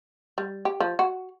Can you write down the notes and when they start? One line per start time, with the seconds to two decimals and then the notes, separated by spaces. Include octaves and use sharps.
0.38 G3
0.65 G4
0.80 F3
0.99 F#4